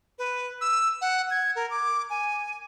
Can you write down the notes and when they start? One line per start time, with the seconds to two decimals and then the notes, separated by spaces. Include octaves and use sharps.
0.18 B4
0.61 E6
1.01 F#5
1.31 G#6
1.56 A#4
1.70 D6
2.10 G#5